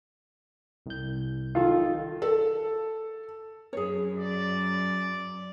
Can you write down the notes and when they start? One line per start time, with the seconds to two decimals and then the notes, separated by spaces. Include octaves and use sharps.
0.86 C2 G6
1.55 D#3 F4 A4
2.22 A4
3.73 F#2 G#4 C#5
4.17 D5